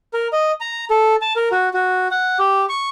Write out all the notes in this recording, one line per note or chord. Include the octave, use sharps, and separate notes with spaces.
A#4
D#5
A#5
A4
A5
A#4
F#4
F#4
F#5
G4
C#6